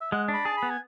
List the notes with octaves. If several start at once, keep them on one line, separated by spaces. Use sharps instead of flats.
E5
G#3 F#5
D4
B5
G#4 A5
B5
B3
G#5